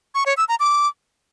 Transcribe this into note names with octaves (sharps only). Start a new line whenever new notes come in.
C#6
C#5
E6
A#5
D6